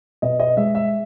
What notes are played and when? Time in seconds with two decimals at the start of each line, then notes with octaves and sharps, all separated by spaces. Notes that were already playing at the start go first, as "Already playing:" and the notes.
0.22 B2 D#5
0.40 D#5
0.57 G#3 E5
0.75 E5